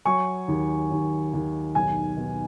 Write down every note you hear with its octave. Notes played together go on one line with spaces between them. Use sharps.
F#3 G#5 C#6
D#2
D#2
D#2
B1 G#5
B2